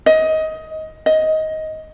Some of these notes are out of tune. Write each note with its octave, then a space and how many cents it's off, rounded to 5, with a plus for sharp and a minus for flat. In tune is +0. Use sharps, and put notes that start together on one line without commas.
D#5 +20
D#5 +15